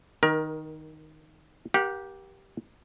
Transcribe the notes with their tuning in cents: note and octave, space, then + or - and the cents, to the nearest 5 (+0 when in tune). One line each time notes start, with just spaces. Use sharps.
D#3 +0 A#4 +25
G4 -5 A#4 +30 F#5 -40